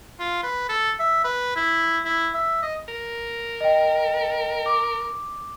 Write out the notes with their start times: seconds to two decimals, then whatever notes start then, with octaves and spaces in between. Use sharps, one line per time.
0.20 F4
0.43 B4
0.69 A4
0.99 E5
1.24 B4
1.56 E4
2.05 E4
2.34 E5
2.63 D#5
2.88 A#4
3.61 D#5 G5
4.66 D6